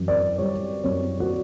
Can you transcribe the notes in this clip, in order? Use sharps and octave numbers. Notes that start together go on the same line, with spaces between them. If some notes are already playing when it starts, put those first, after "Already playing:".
Already playing: F#2 E3
D5
G3 C#5
F#2 C#5
F#4